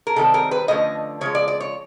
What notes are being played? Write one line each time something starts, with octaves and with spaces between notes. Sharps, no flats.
A#4
C3 D#3 G3 C4 A4
A#4
B4
D3 F3 A3 C#4 D#5
C#3 F3 G#3 C#5
D5
D5
C#5